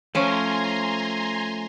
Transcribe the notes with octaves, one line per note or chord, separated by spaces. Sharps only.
F3 A3 C#4 G#5 A#5 C6